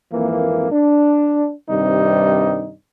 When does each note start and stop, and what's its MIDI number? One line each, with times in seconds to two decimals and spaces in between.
0.12 0.69 32
0.12 0.69 41
0.12 0.69 52
0.12 0.69 58
0.72 1.52 62
1.70 2.73 43
1.70 2.73 48
1.70 2.73 51
1.70 2.73 55
1.70 2.73 60
1.70 2.73 63